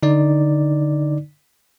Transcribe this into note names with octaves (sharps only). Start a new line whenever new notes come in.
D3 D#4 D5